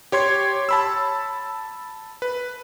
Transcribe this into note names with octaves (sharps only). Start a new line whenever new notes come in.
G4 C#5 C6 G#6
A5 B5 E6
B4